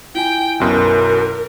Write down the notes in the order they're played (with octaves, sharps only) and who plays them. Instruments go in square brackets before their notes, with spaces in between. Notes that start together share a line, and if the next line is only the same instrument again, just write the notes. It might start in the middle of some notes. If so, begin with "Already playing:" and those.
[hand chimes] E4 F4 G#5 [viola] G5
[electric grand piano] B1 F#2 B2 [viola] A#4